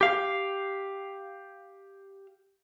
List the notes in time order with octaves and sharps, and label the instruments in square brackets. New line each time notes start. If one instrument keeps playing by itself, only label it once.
[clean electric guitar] G4 F5